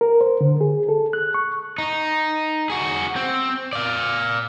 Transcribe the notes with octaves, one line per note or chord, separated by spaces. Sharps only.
A#4
C5
D3
G#4
A4
F#6
C#6
D#4
F#4 G#4
C4
D5 F5